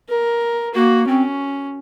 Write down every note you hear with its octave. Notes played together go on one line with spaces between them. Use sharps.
A#4
A#3 F#4
C4 C#4